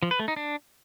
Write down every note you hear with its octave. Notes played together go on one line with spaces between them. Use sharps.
F3
B4
A3
D#4
D4